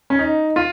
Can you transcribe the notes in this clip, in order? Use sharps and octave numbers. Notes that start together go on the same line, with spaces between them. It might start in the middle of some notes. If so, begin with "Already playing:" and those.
C#4
D#4
F4